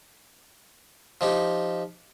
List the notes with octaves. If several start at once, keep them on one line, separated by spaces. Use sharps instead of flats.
F3 D#4 G4